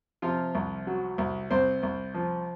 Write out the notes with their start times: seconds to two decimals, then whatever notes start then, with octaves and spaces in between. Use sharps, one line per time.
0.22 C3 F3 F4
0.55 C2
0.87 F#3
1.18 C2
1.50 C2 C4 C5
1.83 C2
2.14 F3